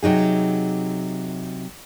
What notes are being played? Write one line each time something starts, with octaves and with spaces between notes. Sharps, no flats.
C3 F#3 D#4 G#4